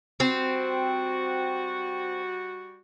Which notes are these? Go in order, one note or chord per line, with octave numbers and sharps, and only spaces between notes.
G3 C4 F#4